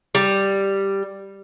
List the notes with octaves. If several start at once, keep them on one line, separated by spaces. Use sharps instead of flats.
G3